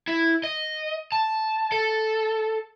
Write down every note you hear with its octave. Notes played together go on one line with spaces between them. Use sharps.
E4
D#5
A5
A4